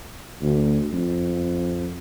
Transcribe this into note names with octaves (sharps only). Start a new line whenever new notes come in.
D2
F2